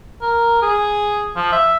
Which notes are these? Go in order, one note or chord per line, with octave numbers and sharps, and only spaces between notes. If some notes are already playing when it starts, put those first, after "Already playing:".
A#4
G#4
F3
E5